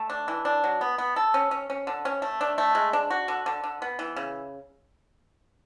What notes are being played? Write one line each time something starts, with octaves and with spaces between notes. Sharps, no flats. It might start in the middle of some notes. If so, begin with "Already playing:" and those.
Already playing: A3
D4
E3
D4
F#3
B3
B3
A4
C#4
C#4
C#4
D3
C#4
A3
D4
A3
G#3
D4
F#4
D3
D3
D3
B3
E3
C#3